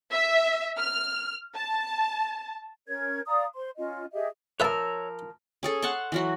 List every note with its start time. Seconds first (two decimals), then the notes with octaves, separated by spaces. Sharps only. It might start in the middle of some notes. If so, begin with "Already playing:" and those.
0.11 E5
0.77 F6
1.55 A5
2.88 C#4 A#4 C#5 G#6
3.26 D5 F5 A#5 D#6
3.55 C5 C6
3.78 C#4 F4 D#5
4.13 G4 G#4 D#5 E5
4.60 F3 A#4 B4 C#5 E5 A5 E6
5.63 C#4 G#4 A4
5.82 F#5 A5 C6 C#6
6.12 E3 F#3 F#4